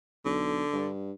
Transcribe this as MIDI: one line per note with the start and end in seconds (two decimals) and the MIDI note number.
0.25 0.63 35
0.25 0.88 50
0.73 1.12 43